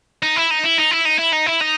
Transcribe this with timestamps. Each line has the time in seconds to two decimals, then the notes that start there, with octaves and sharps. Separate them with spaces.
0.23 D#4
0.36 E4
0.51 D#4
0.64 E4
0.78 D#4
0.91 E4
1.05 D#4
1.19 E4
1.33 D#4
1.46 E4
1.60 D#4